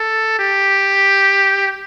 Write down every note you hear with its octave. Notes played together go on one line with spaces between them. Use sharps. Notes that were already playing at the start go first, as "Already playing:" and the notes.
Already playing: A4
G4